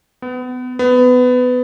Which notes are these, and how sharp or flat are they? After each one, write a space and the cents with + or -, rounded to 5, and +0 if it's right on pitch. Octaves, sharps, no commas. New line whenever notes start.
B3 +30
B3 +20